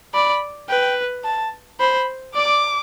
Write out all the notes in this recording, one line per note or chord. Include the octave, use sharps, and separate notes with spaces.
D5 B5
B4 G5
A5
C5 B5
D5 D6